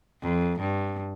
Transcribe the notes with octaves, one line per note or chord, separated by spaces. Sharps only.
F2
G2